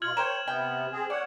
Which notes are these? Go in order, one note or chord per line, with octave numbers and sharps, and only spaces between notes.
B2 F4 F6 G#6 F#7
A#4 C5 C#5 G5 E7
C3 B3 G5
C4 G#4
C#5 D5 F#5